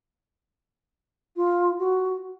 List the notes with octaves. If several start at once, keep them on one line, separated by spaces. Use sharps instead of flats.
F4
F#4